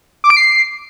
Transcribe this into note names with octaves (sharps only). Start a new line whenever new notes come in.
D6
D7
C7